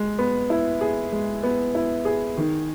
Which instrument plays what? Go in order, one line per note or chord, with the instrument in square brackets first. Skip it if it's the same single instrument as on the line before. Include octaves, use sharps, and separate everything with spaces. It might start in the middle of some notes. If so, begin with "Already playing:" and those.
Already playing: [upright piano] G#3
B3
E4
G#4
G#3
B3
E4
G#4
D#3